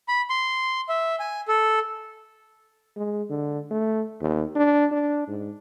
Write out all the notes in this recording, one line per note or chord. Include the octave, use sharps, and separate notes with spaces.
B5
C6
E5
G#5
A4
G#3
D3
A3
D#2
D4
D4
G#2